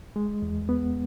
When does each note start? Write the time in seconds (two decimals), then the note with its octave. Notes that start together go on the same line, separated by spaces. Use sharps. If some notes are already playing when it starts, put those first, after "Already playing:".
0.16 G#3
0.42 E2
0.69 B3